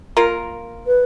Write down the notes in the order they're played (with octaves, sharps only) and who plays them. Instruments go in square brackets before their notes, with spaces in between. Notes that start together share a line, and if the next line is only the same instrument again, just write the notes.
[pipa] A#3 F4 A#4
[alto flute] B4